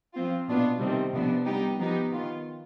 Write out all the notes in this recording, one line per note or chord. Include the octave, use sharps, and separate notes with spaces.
F3 C4 F4
B2 B3 D4 F4
C3 D#3 G3 C4
C3 F3 B3 D4
G3 B3 D#4 G4
F3 B3 D#4 G4
D#3 B3 F4